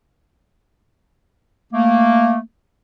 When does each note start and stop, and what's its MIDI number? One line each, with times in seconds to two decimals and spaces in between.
1.72 2.38 57
1.72 2.38 58